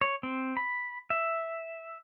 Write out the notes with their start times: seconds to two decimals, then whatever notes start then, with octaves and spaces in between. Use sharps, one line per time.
0.01 C#5
0.23 C4
0.57 B5
1.10 E5